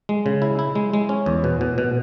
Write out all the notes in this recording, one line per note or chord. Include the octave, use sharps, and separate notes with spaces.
G#3
C#3
E4
E4
G#3
G#3
C#4
E2
B2
B2
B2